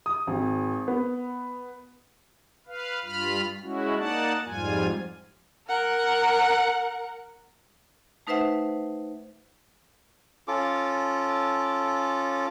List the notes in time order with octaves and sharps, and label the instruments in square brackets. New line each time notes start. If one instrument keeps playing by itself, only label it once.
[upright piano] D#6
G#1
B3
[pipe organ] B4 F5
G2 F4 B5 F6
G#3 C#4 E4 F#4
A#3 D#4 D5 F#5 A5
F2 G#2 G3 F4 G#5
[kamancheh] A#4 F#5
[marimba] A3 D#4 B4 C5 E5 F#5
[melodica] C#4 F4 A4 D6